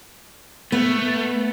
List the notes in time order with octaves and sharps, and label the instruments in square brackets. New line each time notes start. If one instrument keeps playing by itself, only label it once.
[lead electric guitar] A3 [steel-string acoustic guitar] B3